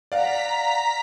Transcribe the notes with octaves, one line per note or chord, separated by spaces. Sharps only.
D5 F5 F#5 A#5 B6